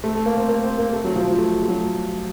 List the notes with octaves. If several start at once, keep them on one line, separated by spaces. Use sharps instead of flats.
A3
A3
A#3
C4
A#3
C4
A#3
A3
F#3
F3
F3
A3
A3
F#3